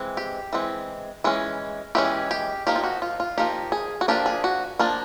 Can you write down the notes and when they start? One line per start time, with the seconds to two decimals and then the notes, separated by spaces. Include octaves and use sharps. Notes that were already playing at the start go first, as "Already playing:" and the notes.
Already playing: E3 G#3 C4
0.17 G4
0.53 E3 G#3 C4
1.24 E3 G#3 C#4
1.95 E3 G#3 C#4 G4
2.31 G4
2.67 F3 A#3 D#4 G4
2.76 F4
2.83 F#4
3.02 F4
3.20 F4
3.38 F3 A#3 D#4 G4
3.72 G#4
4.01 F#4
4.08 F3 A#3 D4 G4
4.26 G#4
4.44 F#4
4.79 F3 A#3 D4